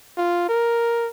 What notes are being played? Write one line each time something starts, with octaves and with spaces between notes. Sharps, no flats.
F4
A#4